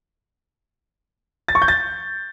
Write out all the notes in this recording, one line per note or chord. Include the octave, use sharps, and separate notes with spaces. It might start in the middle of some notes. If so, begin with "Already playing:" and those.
A6
C#6
G6
A6